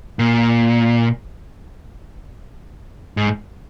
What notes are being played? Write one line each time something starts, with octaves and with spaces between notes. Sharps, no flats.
A#2
G#2